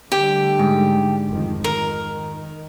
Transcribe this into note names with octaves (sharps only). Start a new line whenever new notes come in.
D3 G3 A3 G4
G#2
F1 D#3 F3
D#3 A#4